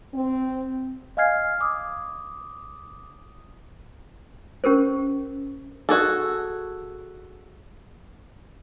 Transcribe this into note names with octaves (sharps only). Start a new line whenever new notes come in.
C4
D#5 F5 G#5 F6 G#6 C7
D6 D#6
C#4 G4 A#4 C5
F#4 G#4 A4